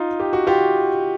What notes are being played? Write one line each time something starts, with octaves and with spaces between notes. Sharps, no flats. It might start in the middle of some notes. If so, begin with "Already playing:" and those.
Already playing: D#4 F4
G4
F#4
F4 G4